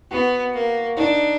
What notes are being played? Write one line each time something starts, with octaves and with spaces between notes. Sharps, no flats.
B3 F#4
A#3
D4 D#4